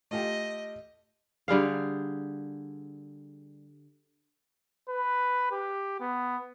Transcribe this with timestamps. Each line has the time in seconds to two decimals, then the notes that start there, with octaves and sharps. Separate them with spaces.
0.11 A3 F4 G4 D#5
1.48 D3 G3 G#4 F5
4.89 B4
5.52 G4
6.00 B3